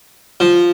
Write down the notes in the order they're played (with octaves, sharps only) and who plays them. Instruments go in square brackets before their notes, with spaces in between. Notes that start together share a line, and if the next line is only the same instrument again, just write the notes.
[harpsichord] F3